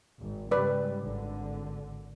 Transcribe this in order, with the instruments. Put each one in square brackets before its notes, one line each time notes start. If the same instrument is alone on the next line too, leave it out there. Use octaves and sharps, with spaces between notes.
[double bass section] G#1
[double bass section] G#2 C#3 G3 [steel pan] B4 D5
[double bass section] G#1 D3